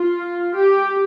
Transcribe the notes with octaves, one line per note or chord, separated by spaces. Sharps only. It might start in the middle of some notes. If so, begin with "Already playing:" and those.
Already playing: F4
G4